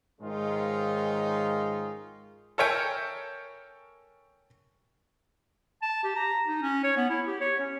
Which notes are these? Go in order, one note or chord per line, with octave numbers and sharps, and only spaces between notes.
G#2 D#3 G#3 C#4 D#4 F4
A4 A#4 C#5 E5 G5 G#5
A5
G4
A#5
D#4
C#4
C#5
B3
E4
G4
C#5
C#4